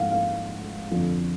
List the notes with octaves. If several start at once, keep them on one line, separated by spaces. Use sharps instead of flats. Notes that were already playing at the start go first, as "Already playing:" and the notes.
Already playing: G#2 F3 F5 F#5
F5
F2 D3 F3